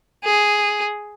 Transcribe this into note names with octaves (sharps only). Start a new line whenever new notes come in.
G#4